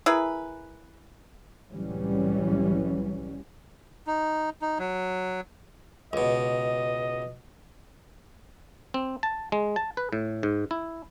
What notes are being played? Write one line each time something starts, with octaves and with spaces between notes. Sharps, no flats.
E4 G#4 A#4 B4
C2 A2 E3 F#3 G3 C#4
D#4
D#4
F#3
C#2 B2 D#5
C4
A5
G#3
A5
B4
A2
G#2
E4